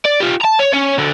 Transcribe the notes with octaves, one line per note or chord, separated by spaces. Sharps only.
D5
F4 G4
A5 A#5
C#5
C#4 C#5
D2 D3